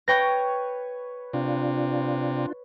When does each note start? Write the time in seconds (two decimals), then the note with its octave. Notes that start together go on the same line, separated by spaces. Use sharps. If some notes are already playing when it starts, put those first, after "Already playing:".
0.08 B4 C#5 G5 A#6
1.33 C3 D4 F4